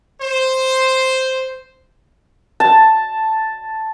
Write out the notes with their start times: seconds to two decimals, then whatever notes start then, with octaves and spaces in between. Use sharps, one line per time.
0.21 C5
2.60 A5